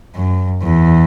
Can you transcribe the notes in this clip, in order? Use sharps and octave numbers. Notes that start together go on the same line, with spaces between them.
F#2
E2